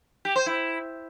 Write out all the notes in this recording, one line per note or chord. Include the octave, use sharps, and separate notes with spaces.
G4
C5
E4